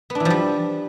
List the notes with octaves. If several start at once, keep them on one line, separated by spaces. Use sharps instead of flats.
B3
D4
E3
F3
G3